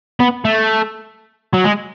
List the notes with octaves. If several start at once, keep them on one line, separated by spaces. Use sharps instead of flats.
B3
A3
F#3
G#3